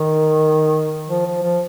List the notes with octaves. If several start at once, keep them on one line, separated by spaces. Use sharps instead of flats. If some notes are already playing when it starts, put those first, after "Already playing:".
Already playing: D#3
F3
F3
F3